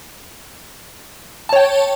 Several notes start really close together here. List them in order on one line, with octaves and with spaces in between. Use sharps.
A5 C#5 G5